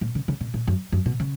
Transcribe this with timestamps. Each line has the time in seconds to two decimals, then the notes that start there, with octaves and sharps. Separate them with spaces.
0.01 A#2
0.15 C#3
0.28 C#3
0.41 B2
0.54 A#2
0.68 F#2
0.92 F#2
1.06 B2
1.20 C#3